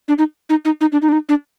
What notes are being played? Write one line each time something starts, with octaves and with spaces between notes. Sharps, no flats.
D4
D#4
D#4
D#4
D#4
D4
D#4
D4
D#4
D4